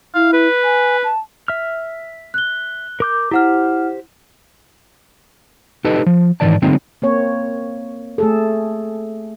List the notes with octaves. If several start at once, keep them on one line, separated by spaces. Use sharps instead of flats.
E4 F5
B4
G#5
A5
E5 F6
F#6 G7
A#4 D6 G6
E4 G4 C5 F#5 F6
D#4 G4 A4 B4 D#5 A5
F3
G#2 D#3 E3 D5 A5
D3 F#3 G#3 A#3 C4 D#4
A#3 C4 C#5
A3 G#4 A4